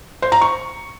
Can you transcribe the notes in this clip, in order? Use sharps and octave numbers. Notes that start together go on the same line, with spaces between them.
C5
A#5
C#6